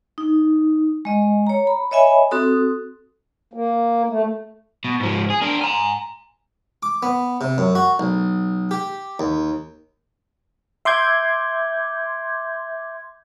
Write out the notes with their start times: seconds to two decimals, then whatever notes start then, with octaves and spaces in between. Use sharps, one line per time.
0.18 D#4
1.05 G#3 D#5
1.47 C#5 A#5
1.67 B5
1.91 C#5 D#5 E5 G#5 B5
2.31 C4 F#4 A4 D#6
3.53 A#3
4.10 A3
4.85 B2
5.00 G#2 F3
5.30 G#4
5.42 D4 A#4
5.61 G#5 A#5
6.83 D6
7.03 B3
7.41 C3
7.58 F#2
7.75 F#4
7.99 B1
8.71 G4
9.19 D#2
10.85 E5 C6 D6 G6 G#6